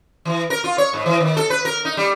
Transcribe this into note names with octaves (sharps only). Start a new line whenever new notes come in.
E3
A#4
F4
C#5
G#2
E3
D#3
A4
B4
A#4
D#4
G3